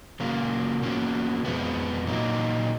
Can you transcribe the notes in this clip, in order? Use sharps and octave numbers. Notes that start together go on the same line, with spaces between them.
C#3 F#3 A#3 F4
B2 A#3 C#4 F#4
F2 F3 G#3 B3
A#2 F#3 A#3 D#4